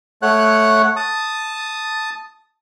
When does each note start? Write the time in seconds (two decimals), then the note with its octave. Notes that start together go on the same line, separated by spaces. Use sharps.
0.22 A3 C#5 F#5 F#6
0.96 A5 D#6